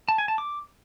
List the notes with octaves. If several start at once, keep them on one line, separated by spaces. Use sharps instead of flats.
A5
G#5
A5
D6